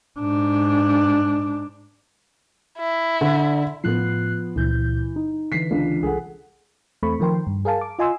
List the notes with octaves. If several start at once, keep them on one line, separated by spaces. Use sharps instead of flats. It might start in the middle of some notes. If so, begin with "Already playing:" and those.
G#2 D4
E4
D3 D4
A2 F3 B3 F#6 C7
C#2 A#2 E3 G6
D#4
D3 E3 B6 C7
C#2 D4
C2 G#4 A4 F#5
E2 A3 C4 B5 C#6
D#3 F3 A#4 G5 C6
G2
G#4 A#4 F5 A5
D6
F4 D#5 G#5 C6 E6